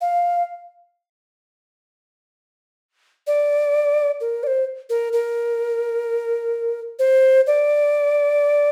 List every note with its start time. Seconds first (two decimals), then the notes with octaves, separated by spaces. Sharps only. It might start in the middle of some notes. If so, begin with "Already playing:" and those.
0.01 F5
3.27 D5
4.21 A#4
4.43 D5
4.47 C5
4.90 A#4
5.13 A#4
6.99 C5
7.47 D5